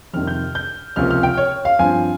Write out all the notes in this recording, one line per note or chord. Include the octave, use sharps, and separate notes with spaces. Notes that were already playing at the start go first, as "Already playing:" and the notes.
F2 C3 D#3 G3 C4 F6
G6
G6
C#2 C3 F3 A#3 C#4 F6
F6
G5
C#5
F5
G2 F3 C4 G#5